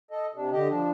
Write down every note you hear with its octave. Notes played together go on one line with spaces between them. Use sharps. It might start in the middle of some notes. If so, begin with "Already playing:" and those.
A4 D#5
C3 D4
D3 G4 D#5
F3 D4